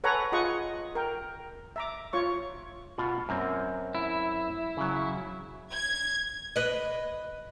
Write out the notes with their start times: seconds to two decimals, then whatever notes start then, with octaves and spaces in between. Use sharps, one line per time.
0.04 A4 B4 C#5 F#5 G#5 A#5
0.32 F4 G#4 D#5 F#5 C#6
0.95 A#4 G5
1.76 E5 A#5 D6
2.13 F4 C#5 C#6
2.98 B2 F4 F#5
3.29 F#2 A#3 C4
3.95 E4
4.77 C#3 F#3
5.73 G#6
6.56 B4 D#5